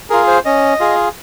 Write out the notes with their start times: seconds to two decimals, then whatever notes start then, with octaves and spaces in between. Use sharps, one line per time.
0.10 F4 G#4 A#4
0.27 C5
0.45 C#4 D#5
0.80 F4 G#4